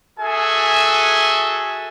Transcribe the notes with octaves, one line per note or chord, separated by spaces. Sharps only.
F#4 G#4 A4 E5 G#5